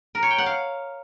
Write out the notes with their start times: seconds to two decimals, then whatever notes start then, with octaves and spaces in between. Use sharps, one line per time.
0.15 A#4
0.23 C#5
0.31 G5
0.38 F#5
0.46 F5